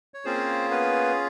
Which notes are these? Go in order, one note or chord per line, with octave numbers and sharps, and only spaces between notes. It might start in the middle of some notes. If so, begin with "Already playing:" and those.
C#5
A#3 C4 C#4 F4 G#4 C5
B3 B4